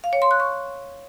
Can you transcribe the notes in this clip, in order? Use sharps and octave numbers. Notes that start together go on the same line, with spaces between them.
F5
C#5
C6
F#6
C#6